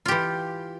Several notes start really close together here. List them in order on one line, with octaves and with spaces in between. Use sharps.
F4 G4 E3